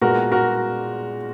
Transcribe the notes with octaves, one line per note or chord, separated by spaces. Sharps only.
A#2 G#3 B3 F#4 A#4
F#4 A#4